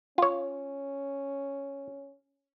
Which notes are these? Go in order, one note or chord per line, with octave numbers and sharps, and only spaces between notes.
C#4 F4 C#5